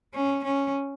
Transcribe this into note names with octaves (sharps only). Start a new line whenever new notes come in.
C#4
C#4